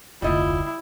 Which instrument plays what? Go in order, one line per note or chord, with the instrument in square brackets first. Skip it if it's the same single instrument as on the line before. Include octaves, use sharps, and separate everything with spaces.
[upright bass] F1 D2 [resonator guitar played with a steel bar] G3 D#5 [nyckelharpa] E4 [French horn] F4